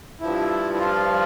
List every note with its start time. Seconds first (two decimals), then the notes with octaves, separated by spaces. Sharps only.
0.21 G2 F3 E4
0.74 E4
0.79 F4